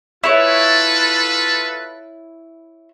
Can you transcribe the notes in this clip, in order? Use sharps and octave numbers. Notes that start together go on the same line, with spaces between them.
E4 F4 A4 B4 C#5